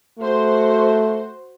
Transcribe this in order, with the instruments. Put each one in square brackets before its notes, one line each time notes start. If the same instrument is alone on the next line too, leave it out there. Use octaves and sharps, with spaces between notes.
[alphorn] A3 [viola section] F#4 C5